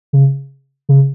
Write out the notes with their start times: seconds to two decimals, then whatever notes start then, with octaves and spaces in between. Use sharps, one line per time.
0.13 C#3
0.89 C#3